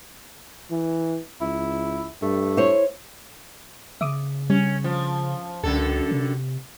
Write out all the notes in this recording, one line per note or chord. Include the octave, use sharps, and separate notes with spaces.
E3
C#2 E4
G2 A3
E4 C5 C#5
C#3 E5 D6 D#6
G3 C#4
F3
C#2 F#2 D3 A4
C3